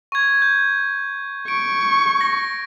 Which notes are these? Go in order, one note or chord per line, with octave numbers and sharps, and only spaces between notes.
C#6 G#6
G6
C#6 D7
A#6